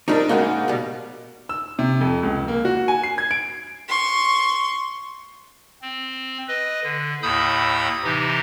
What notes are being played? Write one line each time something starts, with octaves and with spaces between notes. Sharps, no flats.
F3 G3 D4 D#4 A#4
G#2 C#3 G#3 A#3 D#4 F#4
B2 G3
E6
C3
F2
C#2
A#3
F#4
G#5
C7
G#6
D7
C6 C#6
C4
B4 D#5
D3
D#2 A2 B5 D#6 E6 G6
C3 E3 D#4 G4